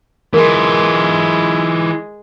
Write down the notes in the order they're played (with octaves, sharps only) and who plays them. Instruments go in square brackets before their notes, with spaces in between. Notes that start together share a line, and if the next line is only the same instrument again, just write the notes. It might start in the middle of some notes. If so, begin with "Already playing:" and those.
[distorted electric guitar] E3 F4 [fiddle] G#3 [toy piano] A#4